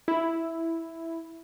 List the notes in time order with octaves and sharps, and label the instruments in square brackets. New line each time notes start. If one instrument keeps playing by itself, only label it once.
[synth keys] E4